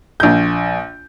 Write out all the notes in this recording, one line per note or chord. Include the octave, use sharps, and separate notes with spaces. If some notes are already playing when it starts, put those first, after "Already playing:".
A#1 G6